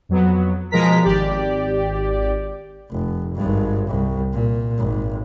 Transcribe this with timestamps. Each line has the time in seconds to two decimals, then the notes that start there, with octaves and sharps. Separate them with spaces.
0.09 F2 F#3 B3
0.71 B2 F3 G#3 A#4 A#5 B6
1.02 G#1 G4 D5
2.91 F1
3.35 G#1 G2
3.88 C2
4.33 A#2
4.78 G#1